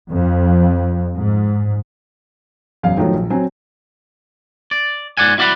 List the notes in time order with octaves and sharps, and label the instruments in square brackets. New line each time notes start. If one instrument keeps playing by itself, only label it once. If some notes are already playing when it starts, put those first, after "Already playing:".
[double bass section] F2
G#2
[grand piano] E1 F#2 F5
D#3 F3 F#3 A3
A#1
F#3 C4 G#5
[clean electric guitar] D5
G#2 D5 F#5 G#5
E4 F#4 D5 F#5 B5